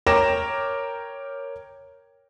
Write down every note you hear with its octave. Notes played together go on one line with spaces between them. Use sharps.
A#4 C#5 G5 D6 A#6 E7